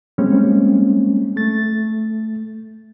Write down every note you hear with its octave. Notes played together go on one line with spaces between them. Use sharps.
G3 G#3 A#3 C4 C#4
A3 A6